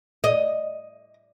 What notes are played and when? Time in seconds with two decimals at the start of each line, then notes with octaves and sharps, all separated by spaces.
0.24 D#5